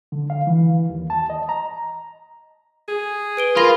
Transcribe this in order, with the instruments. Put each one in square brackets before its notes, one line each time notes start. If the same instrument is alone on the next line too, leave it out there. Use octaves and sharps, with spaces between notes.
[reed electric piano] D3
F5
E3
D#2
A5
D#5
A#5
[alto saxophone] G#4
[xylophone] B4 D7 G7
[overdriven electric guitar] F4 [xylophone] A#4 B5 A#6